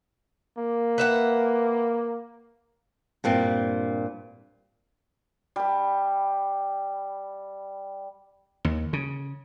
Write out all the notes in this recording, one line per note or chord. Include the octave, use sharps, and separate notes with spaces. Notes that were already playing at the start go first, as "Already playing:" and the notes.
A#3
B4 E5 F#5
G2 A#2 C4
G3 A5
D#2
C#3